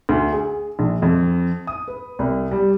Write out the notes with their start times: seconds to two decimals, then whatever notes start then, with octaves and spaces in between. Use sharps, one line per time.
0.09 D2
0.33 G#4
0.79 A#1
1.02 F2
1.67 D#6
1.88 B4
2.19 C2
2.51 G3